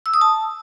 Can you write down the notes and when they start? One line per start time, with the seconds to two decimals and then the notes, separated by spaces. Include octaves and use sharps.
0.06 E6
0.14 D#6
0.21 A5